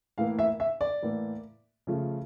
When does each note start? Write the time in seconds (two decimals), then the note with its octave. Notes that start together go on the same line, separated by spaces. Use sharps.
0.18 A2 E3 A#3 F5
0.39 E5
0.60 E5
0.81 D5
1.02 A2 E3 A#3
1.87 C#3 F3 A3